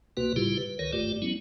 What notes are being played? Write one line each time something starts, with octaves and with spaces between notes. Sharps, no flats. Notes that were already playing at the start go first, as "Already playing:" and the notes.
C2 B2 A#3 F#4 B4
A2 C#3 G3 E4 F4 G4
B4
C#2 D#3 A#4 B4 C#5
G1 G2 A3 F4 G4 D5
F#3 G#3 B3 C#4 E4